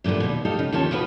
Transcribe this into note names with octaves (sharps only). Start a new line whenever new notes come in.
E2 A#2 D3 G3 B3
D#2 B2
D#4 G4 A4 F5
C#3
D#2 F4 G4 C#5 A5
D#3 F3 F4 F#4 B4